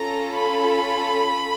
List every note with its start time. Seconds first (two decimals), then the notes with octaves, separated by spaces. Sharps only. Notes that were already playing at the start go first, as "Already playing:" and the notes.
Already playing: C#4 F4 A4 A#5
0.35 B5